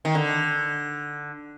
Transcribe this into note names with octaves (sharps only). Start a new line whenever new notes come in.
D#3
D3